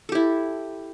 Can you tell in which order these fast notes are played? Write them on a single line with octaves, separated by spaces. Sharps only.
A4 G4 E4